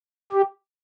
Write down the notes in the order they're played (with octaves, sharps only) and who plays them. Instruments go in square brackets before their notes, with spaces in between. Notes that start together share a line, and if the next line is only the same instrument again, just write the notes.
[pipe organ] G4